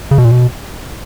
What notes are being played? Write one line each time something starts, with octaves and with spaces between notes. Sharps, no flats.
C#3
B2
A#2
B2